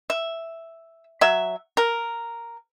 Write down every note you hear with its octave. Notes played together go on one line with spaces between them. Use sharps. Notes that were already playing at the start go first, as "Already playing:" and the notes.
E5
F#3 E5
A#4